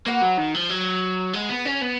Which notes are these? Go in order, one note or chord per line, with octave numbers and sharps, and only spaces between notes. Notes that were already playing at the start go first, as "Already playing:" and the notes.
A#3 F#4 B4 F#5
F#3
D#3
F3
F#3
G#3 G#4 B4 F#5
B3
C#4
B3